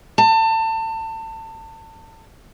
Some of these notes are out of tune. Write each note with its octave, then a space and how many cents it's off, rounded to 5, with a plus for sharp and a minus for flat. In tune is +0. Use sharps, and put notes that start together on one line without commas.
A5 +30